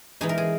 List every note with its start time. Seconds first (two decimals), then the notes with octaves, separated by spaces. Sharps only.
0.21 E3 G#3 D#4 G#4
0.29 A#4
0.38 G#4